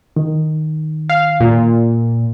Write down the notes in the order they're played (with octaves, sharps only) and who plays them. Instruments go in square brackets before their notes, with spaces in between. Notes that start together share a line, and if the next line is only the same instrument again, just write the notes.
[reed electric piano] D#3
[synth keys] F5
A#2